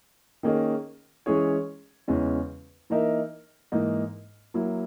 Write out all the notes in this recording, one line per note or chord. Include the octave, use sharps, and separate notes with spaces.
D#3 A#3 C#4 G#4 D#5
E3 G#3 C#4 G#4 C#5
E2 C#3 E3 G#3 C#4
E3 A#3 D#4 A#4 E5
G#2 E3 A#3 D#4
F#3 A#3 E4